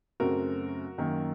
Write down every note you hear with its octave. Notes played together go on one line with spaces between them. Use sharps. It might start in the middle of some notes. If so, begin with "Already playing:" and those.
F#2 C#3 F#3 A3 C4 F#4 A#4
F#2 D#3 A#3